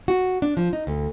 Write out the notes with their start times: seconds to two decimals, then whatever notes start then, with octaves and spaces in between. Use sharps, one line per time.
0.08 F#4
0.42 D4
0.57 F3
0.73 D#4
0.87 D2